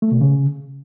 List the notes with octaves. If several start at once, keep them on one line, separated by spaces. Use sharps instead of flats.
A3
B2
C#3